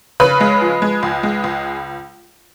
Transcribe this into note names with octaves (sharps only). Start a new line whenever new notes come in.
C#3 B4 B5
G#3
F3
G#3
C#2
G#3
C#2